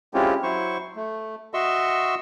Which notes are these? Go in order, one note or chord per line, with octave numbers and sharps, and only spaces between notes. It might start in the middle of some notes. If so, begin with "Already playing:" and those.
G#3 C4 C#4 E4 F4 G4
F#3 E4 C5 C#6
A3
F#4 D#5 E5 C6 C#6 E6